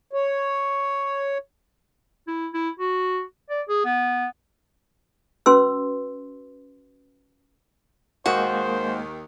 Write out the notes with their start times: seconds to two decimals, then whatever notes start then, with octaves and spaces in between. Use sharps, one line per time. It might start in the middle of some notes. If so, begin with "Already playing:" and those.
0.13 C#5
2.27 E4
2.54 E4
2.79 F#4
3.50 D5
3.69 G#4
3.85 B3
5.46 C#4 F#4 B4 C6 E6
8.26 D#2 D#3 G#3 A#3 F#4 G#4 C5